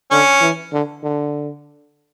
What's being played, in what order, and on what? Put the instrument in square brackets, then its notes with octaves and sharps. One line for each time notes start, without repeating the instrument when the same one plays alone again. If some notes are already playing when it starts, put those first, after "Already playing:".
[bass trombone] D3 [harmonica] C#4
[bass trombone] E3
D3
D3